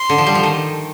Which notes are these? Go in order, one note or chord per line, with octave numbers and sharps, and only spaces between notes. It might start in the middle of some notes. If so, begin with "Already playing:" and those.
Already playing: C6
D3
F3
G3
F3
D#3